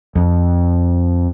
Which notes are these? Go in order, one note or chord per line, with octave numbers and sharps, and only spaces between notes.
F2